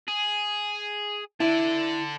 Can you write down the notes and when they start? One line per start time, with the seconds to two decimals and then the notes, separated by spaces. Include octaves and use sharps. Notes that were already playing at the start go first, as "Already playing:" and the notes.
0.08 G#4
1.40 E4 A4 D5